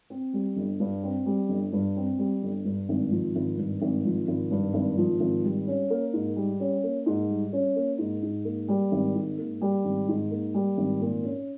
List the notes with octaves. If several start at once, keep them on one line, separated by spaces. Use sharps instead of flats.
C4
G3
G1
G2
C4
G3
G1
G2
C4
G3
G1
G2
G#1
F3
G#1
G2
G#1
F3
G#1
G2
G#1
F3
G#1
G3
C#4
A#3
G#2
G3
C#4
A#3
G#2
G3
C#4
A#3
G#2
G#2
A#3
G3
G#1
G#2
A#3
G3
G#1
G#2
A#3
G3
G#1
A#2
C#4